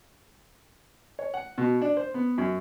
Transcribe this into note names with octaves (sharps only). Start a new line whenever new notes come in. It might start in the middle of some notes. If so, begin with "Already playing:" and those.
C#5
F#5
B2
D4
C5
B3
F#2